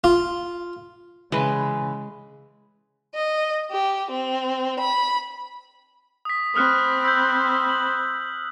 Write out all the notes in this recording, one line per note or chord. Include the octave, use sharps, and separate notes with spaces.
F4
C#3 E3 G#3 B4
D#5
G4
C4
B5
D#6 B6
C4 B5 D#6 F6 F#6
E6 G6
F#7